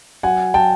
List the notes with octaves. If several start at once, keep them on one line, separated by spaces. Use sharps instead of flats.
F#3 F#5 G#5
F#3 G5 A5